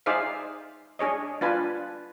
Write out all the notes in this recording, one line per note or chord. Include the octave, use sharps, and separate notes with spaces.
D#4 G#4 C5 D5 E5 F5
D4 G#4 C#5 D#5
D4 F4 B4 G#5 A5